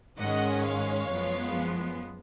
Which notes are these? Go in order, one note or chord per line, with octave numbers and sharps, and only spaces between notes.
G#2 D#3 G#3 C#4 D#5 F#5
C#5 F5
F#2 F3 G#3 B3